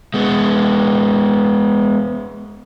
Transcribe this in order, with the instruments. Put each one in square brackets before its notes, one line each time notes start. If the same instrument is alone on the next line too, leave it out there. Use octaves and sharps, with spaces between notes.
[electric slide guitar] G#3 B3